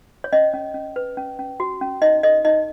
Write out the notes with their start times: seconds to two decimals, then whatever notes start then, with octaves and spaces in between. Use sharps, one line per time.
0.24 C#5
0.33 C#4 D#5
0.53 C#4
0.74 C#4
0.96 B4
1.17 C#4
1.39 C#4
1.60 F#4
1.81 C#4
2.02 D#4 D#5
2.23 A4 D#5
2.45 D#4 D#5